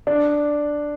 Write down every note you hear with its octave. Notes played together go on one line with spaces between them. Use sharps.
D4